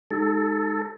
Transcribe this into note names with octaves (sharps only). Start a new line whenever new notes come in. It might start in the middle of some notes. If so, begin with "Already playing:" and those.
G#3 D#4 G4 A4